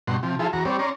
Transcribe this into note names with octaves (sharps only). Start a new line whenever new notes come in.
G2 B2 F#5 C6
C3 F3
F3 E4 F4 G#4 A4
E2 F#4 A#5
G3 C4 C#5 D5
C#4 D5 A#5 C6